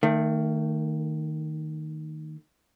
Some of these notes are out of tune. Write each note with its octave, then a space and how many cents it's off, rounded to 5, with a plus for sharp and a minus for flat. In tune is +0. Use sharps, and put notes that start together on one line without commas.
D#3 -5 A3 +35